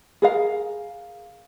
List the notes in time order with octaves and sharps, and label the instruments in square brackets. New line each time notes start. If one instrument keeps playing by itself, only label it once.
[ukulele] G#4 A#4 F5